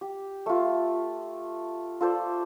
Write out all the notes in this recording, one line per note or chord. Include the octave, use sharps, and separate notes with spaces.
G4
A3 F4
F4 A4 C5 D5